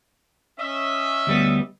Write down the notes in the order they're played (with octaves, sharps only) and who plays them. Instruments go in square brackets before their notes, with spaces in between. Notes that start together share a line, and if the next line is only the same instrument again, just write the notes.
[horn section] C#4 D#5 E5
[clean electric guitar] D2 G3 B3